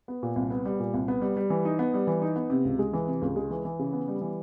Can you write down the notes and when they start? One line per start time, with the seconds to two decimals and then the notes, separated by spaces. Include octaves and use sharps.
0.08 B3
0.23 A#2
0.36 C2
0.50 B3
0.65 G3
0.80 A#2
0.94 C2
1.08 B3
1.21 G3
1.37 G3
1.50 E3
1.65 D#4
1.79 B3
1.94 G3
2.07 E3
2.22 D#4
2.36 B3
2.50 C3
2.65 C#2
2.79 G#3
2.93 E3
3.07 C3
3.22 C#2
3.36 G#3
3.51 E3
3.65 E3
3.79 C#3
3.93 B3
4.08 G3
4.22 E3